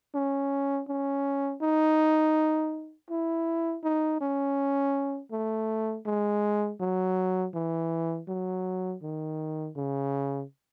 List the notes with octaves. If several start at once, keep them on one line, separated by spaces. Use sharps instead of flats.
C#4
C#4
D#4
E4
D#4
C#4
A3
G#3
F#3
E3
F#3
D#3
C#3